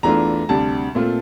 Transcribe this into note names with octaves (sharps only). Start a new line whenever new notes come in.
E2 E3 A3 D4 F4 A#5
D2 C3 G3 D4 A5
A#2 A3 C4 F4